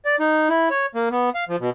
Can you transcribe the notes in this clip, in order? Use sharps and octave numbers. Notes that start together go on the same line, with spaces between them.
D5
D#4
E4
C#5
A#3
B3
F5
F3
B2